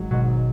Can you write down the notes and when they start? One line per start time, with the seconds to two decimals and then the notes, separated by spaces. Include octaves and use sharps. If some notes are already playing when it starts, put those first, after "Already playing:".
Already playing: G#1 G#2 F#3
0.11 G#1 G#2 B2 F#3